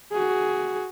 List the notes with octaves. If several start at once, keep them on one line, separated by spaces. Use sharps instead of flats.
F#4 G#4